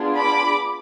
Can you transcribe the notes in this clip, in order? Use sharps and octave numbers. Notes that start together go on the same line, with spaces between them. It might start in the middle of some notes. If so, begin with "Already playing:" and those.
Already playing: B3 D4 F4 G#4
B5 D6